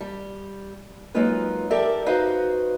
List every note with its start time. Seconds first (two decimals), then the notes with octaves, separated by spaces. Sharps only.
0.01 G3
1.14 F#3 G#3 A#3 D#4 F4 B4
1.70 G4 A4 A#4 D5 E5
2.06 D#4 F#4 B4 C5 D#5 F5